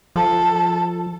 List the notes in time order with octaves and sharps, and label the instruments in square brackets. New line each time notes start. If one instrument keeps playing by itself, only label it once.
[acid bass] F3 [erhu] A4